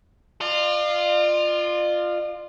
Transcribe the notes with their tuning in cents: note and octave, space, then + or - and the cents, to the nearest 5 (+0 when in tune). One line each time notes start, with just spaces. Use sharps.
F4 +0 D5 +45